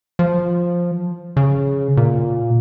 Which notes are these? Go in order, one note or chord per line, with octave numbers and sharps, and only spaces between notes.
F3
C#3
A#2